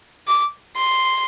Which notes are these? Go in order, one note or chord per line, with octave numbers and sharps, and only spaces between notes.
D6
C6